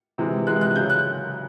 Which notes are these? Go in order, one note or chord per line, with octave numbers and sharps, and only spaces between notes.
C3 E3 G#3
C3 E3 G#3 F#6
F#6
C#3 F#3 G6
F#6